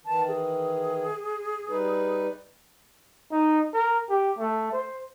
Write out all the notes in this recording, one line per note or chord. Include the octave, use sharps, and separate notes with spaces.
D#3 E3 A5
G#4
G3 D#4 B4
D#4
A#4
G4
A3
C5